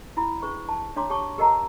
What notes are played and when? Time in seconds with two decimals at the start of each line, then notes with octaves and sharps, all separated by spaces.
0.17 E4 B5
0.42 D4 G#4 B4 C#6
0.69 A5
0.96 D4 C#5 F5 A#5 C6 D6
1.10 G4 C#5 A5 C#6 D6
1.38 G4 A#4 D#5 F#5 A5 A#5